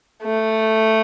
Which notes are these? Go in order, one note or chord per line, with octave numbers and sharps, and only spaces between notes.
A3